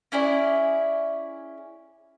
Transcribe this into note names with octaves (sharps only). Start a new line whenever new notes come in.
C#4 E4 G#4 D5